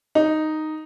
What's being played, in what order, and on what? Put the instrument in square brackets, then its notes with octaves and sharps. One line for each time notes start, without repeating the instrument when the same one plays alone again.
[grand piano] D#4